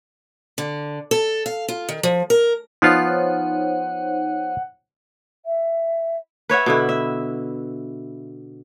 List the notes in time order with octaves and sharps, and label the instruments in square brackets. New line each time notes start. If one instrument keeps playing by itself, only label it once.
[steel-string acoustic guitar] D3
A4
F5
F4
D#3
F3
A#4
[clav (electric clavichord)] F3 B3 F4 [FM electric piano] D#4 C5 C#5 [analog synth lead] F#5
[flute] E5
[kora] B4 C#5 E5 F#5
B2 D3 E4
E5